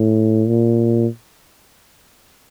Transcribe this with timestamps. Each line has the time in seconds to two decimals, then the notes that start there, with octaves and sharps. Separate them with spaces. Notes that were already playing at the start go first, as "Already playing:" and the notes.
Already playing: A2
0.48 A#2